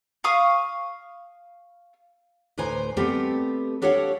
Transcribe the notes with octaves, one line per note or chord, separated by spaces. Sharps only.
F5 C#6 D#6
D2 A2 B4 C5 G#5 A#5
G3 A3 B3 C4 G4 A4
D4 G4 A4 C#5 F5 F#5